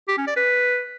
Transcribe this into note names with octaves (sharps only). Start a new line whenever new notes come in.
G4
C#4
D5
B4